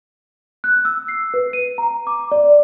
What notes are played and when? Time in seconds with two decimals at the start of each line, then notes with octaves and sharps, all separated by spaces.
0.64 F#6
0.85 E6
1.08 C7
1.34 B4
1.53 D#7
1.78 A#5
2.07 D6
2.32 D5